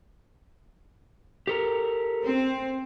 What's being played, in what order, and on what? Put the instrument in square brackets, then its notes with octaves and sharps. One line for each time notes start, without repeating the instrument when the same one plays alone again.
[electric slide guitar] G4 A4 A#4
[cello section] C4